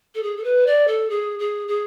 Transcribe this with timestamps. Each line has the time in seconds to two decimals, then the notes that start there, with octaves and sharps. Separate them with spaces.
0.14 A4
0.22 G#4
0.37 A4
0.44 B4
0.66 D5
0.87 A4
1.09 G#4
1.39 G#4
1.68 G#4